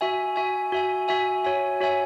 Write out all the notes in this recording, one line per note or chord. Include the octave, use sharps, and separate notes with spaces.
F#4 E5 G#5
F#4 E5 G#5
F#4 E5 G#5
F#4 E5 G#5
F#4 C#5 E5 G#5
F#4 C#5 E5 G#5